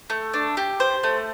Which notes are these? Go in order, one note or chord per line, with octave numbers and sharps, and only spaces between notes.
A3
D4
G4
C5
A3